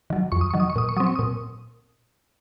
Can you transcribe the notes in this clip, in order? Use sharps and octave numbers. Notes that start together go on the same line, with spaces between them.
D#3 F#3
F2 C#6
D#6
D#3 F#3 C#6
D#6
C#6
A#2 D#6
C#6
F#3 C4 D#6
C#6
A#2 D#6